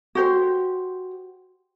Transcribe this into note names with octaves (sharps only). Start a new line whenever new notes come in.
F#4 G4 C5